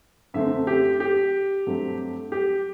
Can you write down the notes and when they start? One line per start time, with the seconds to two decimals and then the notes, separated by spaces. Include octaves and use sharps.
0.34 F#2 D3 A3 C4 E5
0.67 G4
1.00 G4
1.66 G2 F#3 A3 C4
2.32 G4